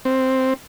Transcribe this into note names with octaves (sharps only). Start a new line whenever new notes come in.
C4